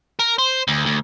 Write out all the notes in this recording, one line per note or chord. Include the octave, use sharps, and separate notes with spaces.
A#4
C5
D2
D2